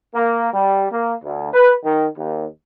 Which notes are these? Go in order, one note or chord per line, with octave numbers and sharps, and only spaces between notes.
A#3
G3
A#3
D2
B4
D#3
D#2